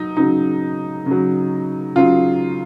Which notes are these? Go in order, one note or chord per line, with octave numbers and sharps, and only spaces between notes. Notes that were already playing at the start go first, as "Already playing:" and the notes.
Already playing: F#3 D#4
C#3 F#3 D#4
C#3
F#3
C#3 F#3 F4